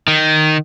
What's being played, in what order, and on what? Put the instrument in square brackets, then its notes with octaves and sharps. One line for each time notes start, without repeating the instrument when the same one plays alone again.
[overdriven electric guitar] D#3